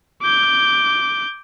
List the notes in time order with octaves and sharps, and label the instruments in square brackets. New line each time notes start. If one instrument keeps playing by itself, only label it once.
[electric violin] D6 G6